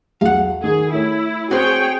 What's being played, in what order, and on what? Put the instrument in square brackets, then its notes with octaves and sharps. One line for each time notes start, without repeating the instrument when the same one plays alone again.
[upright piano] B1 E2 [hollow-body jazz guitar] F5 F#5
[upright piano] D#3 [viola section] G#4
[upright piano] A3 A4 C#5 [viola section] E4
[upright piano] C4 [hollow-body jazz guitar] F#4 C5 [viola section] G#4 C#5 G5